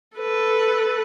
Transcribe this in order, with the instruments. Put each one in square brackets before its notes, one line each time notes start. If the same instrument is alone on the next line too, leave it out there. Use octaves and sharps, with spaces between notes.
[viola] A4 B4